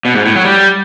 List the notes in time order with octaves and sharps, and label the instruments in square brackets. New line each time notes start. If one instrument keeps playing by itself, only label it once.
[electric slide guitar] B2
G#2
A2
F#3
G3